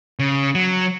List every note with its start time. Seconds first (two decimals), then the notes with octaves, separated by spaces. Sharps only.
0.19 C#3
0.55 F#3